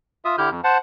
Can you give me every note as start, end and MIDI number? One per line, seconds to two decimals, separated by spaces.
0.25 0.36 65
0.25 0.36 76
0.25 0.36 87
0.38 0.50 50
0.38 0.50 64
0.38 0.50 67
0.38 0.50 89
0.38 0.50 91
0.51 0.61 41
0.64 0.78 72
0.64 0.78 78
0.64 0.78 81